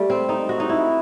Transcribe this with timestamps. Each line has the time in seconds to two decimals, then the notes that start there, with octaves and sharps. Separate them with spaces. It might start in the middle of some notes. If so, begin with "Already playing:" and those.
Already playing: G3 A3
0.10 C4
0.29 D#4
0.49 F#4
0.60 D#4
0.69 E4